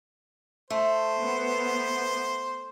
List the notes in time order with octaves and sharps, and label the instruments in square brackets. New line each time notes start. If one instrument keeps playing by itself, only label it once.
[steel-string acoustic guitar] A3 [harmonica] C5
[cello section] B3